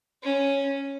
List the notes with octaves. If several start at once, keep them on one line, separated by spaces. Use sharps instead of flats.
C#4